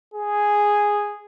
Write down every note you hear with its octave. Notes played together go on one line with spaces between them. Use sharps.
G#4